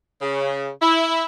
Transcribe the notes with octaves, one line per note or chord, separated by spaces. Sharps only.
C#3
E4